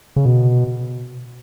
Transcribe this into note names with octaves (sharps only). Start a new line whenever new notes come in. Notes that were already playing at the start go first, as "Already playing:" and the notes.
C#3
B2